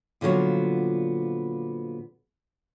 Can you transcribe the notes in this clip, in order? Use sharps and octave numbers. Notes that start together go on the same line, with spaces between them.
A#2 D3 F3 F#3 B3